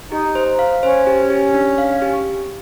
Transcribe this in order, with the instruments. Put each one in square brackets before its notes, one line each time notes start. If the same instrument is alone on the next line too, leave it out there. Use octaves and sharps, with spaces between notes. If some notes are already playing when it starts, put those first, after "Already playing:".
[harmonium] D#4 [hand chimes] G4
[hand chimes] C5
F5
[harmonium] C#4 [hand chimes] C5
[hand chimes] G4
G4
D4
F5
G4